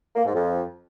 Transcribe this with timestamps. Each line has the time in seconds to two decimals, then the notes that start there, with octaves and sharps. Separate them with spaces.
0.16 A#3
0.25 G#2
0.34 F2